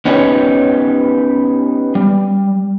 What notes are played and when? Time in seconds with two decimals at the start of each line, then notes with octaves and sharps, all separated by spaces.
0.05 B3 C#4 D#4 G4 B4 C#5
1.95 G3